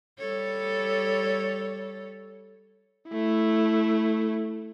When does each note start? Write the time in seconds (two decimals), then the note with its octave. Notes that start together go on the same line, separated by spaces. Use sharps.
0.18 G3 A4 C#5
3.09 A3 E4